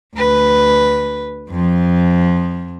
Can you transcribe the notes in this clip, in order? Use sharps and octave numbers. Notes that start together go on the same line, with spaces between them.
D2 B4
F2 F3